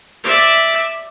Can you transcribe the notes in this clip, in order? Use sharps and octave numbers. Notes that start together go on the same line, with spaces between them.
D5 E5